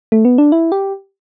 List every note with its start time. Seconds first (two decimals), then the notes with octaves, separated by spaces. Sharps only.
0.12 A3
0.25 B3
0.38 D4
0.52 E4
0.72 G4